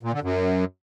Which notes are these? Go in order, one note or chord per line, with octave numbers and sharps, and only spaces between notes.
A#2
D3
F#2